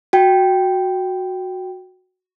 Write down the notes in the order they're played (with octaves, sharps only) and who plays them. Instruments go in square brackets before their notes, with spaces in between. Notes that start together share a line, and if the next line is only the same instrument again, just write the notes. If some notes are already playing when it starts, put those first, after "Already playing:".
[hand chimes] F#4 G5